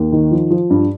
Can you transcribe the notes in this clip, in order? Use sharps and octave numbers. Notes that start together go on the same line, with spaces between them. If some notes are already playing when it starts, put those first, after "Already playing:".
Already playing: D#2
D#3
F3
F3
G2